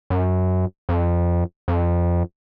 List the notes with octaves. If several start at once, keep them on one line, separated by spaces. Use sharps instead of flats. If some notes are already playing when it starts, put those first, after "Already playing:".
F#2
F2
F2